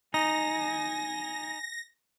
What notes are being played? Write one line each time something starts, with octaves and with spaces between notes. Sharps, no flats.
D#4 G#5 A#6